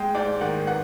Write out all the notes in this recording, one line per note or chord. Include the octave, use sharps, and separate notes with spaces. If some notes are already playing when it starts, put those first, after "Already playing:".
Already playing: G#3 G5
G#2 D5
D#3 F#5
B3 F#5